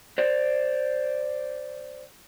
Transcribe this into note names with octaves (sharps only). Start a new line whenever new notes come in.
C5 D5